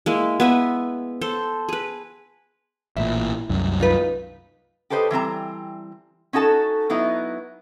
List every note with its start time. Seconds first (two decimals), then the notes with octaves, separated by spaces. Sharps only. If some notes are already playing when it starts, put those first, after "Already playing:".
0.06 G#3 A#3 E4
0.40 B3 B4 E5 G#5
1.21 A4 C5
1.69 G#4 B4
2.97 A1 A#2 E4
3.49 C2 F#2
3.80 D#4 F4 B4
4.90 G4 A4 B4 C5 D#5
5.11 E3 G3 C4 A#5
6.33 C#4 D#4 F#4 A4 A5
6.90 F#3 B3 D#4 E4